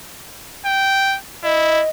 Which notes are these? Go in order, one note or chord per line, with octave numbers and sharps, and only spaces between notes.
G5
E4 D#5